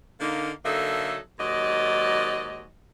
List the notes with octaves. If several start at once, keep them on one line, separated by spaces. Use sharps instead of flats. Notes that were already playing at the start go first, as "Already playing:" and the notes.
D3 A#3 D#4
D3 F#3 A#3 D#4 A4 E5
D#2 G#2 F#3 D5 D#5